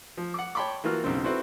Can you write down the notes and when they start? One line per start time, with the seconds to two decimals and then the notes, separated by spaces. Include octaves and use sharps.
0.17 F3
0.34 F#5 D6
0.55 C#5 G5 A5 B5 C6 D6
0.84 E3 A#3 F4 F#4 F6
1.04 B1 C#3 C4
1.24 C4 E4 F#4 A4 B4 C5